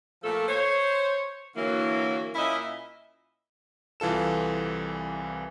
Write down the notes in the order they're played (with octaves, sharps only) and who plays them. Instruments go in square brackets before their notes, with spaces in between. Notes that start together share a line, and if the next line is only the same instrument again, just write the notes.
[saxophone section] A#2 F3 A3 A4
C5 C#5
D3 E3 F#3 A#3 E4
A#2 C#4 E4 D#5 E5
[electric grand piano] C2 E3 F4 A4 E7